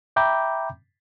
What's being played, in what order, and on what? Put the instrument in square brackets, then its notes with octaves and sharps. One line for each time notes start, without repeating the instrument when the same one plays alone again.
[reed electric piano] E5 G5 A#5 B5 D6 G6